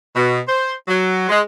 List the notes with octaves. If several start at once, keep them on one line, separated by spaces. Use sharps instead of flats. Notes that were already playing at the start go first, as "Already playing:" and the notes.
B2
C5
F#3
G#3